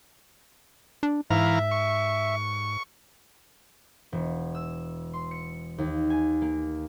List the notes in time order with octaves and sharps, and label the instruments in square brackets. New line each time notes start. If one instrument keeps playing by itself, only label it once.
[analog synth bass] D4
[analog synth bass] G#2 [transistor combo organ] E3 F5 A#5 [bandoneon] E5
[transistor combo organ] C#6
[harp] E1
E6
C6
C#7
D#2
G#5
A#3